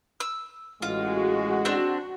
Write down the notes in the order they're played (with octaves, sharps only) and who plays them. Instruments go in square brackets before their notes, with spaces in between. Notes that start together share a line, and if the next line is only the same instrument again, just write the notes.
[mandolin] E6
[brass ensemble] A1 G#3 [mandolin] F4 [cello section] F#4
[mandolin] C4 D4